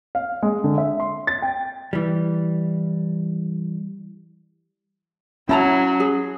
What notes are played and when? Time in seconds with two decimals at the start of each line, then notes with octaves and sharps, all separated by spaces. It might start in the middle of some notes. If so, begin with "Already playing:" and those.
0.15 F5
0.42 G#3
0.64 D3
0.78 E5
1.00 C6
1.27 A6
1.42 G5
1.93 E3 G3
5.49 F#3 C#4 E4 A5 A#5
6.00 G#4